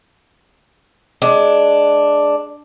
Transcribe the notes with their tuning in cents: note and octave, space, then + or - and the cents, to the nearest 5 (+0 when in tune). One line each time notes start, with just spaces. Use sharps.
G#3 +10 D4 +0